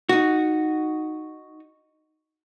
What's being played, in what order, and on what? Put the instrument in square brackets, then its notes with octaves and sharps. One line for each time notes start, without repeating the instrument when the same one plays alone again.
[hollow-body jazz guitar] D#4 F#4